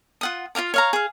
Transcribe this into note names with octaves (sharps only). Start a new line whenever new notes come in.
F4 F#5 D#6
F4 D#5 F5 D6
C#5 F5 A#5
G#4 F5